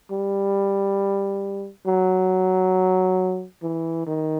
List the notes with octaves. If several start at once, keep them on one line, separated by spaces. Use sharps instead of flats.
G3
F#3
E3
D#3